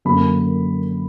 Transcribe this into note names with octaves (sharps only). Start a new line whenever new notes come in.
F#2 D3 F#3 A#3 B5